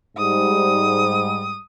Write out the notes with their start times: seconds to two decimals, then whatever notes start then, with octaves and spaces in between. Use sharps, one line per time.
0.18 G#2 G3 D#6